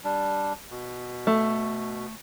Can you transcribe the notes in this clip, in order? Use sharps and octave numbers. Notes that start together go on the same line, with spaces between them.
G3 D4
B2
A3